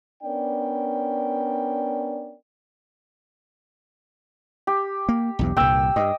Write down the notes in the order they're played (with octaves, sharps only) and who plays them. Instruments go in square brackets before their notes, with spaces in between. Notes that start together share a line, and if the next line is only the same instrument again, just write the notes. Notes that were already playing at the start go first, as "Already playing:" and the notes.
[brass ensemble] B3 C#4 D4 A#4 D5 G5
[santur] G4
[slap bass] A#3
B1 E2 G2
[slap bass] C2 G2 A#2 [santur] G5 E6
[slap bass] G2 [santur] D#5